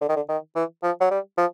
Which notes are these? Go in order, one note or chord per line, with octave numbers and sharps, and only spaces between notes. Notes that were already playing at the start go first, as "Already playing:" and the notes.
D3
D#3
D3
D#3
E3
F3
F#3
G3
F3